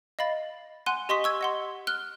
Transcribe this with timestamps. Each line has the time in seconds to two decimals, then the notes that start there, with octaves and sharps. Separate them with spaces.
0.19 D#5 F5 B5 A6
0.86 F#5 G#5 C6 F#6 D#7
1.09 G4 D#5 C6 C#6 D#6 B6
1.24 C#6 E6 G#6
1.41 D#5 F#5 C6
1.87 F6 F#6 G7